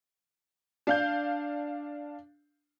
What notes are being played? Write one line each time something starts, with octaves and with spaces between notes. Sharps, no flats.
D4 F5 G6